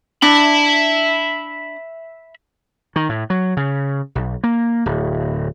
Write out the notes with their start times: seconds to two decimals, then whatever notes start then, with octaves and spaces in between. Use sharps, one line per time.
0.22 D4 E5 B5
2.96 D#3
3.09 A2
3.30 F#3
3.57 C#3
4.15 B1
4.44 A#3
4.86 D1